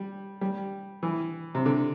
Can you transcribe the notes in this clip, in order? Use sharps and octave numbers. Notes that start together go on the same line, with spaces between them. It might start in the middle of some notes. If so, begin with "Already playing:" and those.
Already playing: G3
G3
E3
C3
D3